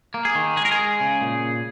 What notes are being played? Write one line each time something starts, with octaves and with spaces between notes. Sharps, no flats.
A#3
G#4
D#3
G#3 G#4
A#4
G#4
G#3
C#3
A#2